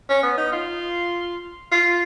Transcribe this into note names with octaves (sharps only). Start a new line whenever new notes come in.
C#4
B3
D#4
F4
F4